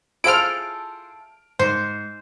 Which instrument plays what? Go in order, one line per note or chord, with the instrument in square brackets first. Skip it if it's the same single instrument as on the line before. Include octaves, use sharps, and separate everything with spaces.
[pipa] E4 A4 [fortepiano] F4 G#4 C5 [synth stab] F6 D7
[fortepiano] G#2 [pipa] C5